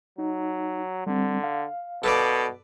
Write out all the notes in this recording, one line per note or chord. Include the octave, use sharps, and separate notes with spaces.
F#3 D#4
D3 G3 C4
F5
B2 A4 B4 D5